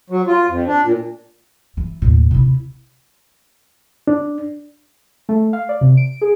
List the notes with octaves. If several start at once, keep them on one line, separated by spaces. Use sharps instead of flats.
F#3
F4
F2
D4
A#2
E3
D#2 A2
C3 E4
D4
A3
F5
D5
C3
D7
G#4